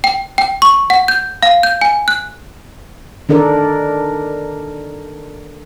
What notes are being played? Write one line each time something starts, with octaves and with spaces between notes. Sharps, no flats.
G5
G5
C#6
F#5
G6
F5
G6
G#5
F#6
D#3 D4 A4 A#4 D5